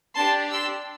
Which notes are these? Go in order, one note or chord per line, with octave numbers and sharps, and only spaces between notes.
D4 G4 A5 C6
C6 E6